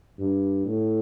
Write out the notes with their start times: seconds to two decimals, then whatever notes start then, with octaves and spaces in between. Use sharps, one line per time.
0.19 G2
0.65 A2